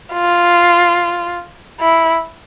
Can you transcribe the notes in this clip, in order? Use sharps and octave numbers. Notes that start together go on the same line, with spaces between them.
F4
E4